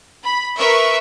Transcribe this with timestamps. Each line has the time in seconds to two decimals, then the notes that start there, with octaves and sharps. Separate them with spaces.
0.24 B5
0.57 A#4 B4 E5 C#6